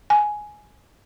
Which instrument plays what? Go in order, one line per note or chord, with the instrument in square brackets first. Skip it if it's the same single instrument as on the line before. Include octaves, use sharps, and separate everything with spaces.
[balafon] G#5